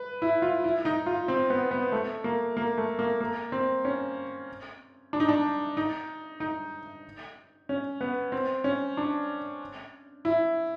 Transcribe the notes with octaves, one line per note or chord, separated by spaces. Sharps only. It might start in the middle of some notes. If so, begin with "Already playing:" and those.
Already playing: B4
E4
F4
E4
D#4
F4
C4
B3
B3
A3
A#3
A#3
A3
A#3
A#3
C4
C#4
D4
D#4
D4
D#4
D#4
C#4
B3
C4
C#4
D4
E4